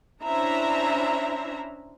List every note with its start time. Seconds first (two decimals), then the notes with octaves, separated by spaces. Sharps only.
0.24 C#4 D4 E4 C5 E5 A#5